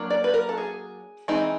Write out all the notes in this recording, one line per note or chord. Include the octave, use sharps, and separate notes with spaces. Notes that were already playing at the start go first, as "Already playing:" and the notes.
Already playing: F#3 A#3 D4
D5
B4
A#4
A4
G#4
E3 G#3 C4 D#4